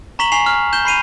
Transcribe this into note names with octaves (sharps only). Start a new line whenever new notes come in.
A#5 C#6 B6 E7 F#7
G#5 C#6 B6 C7 F7
F6
G6 E7 G7
B5 C7 D#7 F7